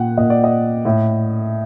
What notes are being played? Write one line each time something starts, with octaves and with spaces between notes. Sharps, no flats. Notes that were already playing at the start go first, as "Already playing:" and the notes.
Already playing: A#2 F#5 G5
A#2 D#5
D5
D#5
A2